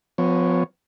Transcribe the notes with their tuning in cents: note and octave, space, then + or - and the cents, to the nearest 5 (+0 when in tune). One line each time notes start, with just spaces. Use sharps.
F3 +25 B3 +35 C#5 +0